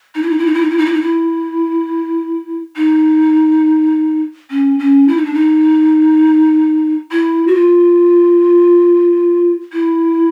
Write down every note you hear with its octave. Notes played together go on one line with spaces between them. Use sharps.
D#4
E4
D#4
E4
D#4
E4
D#4
E4
D#4
E4
D#4
E4
D#4
C#4
C#4
E4
D#4
D4
D#4
E4
F#4
F4
E4